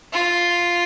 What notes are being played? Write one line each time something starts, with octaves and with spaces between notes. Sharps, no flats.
F4